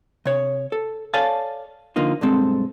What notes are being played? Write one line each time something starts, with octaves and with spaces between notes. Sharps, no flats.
C3 C#5
A4
A4 C#5 D5 F5 G#5 A5
D3 F3 A#3 D#4 F4
B1 G2 G#3 C4 A4